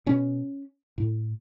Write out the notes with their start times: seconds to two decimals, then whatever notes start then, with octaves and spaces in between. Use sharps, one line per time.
0.06 B2 C#4
0.98 A2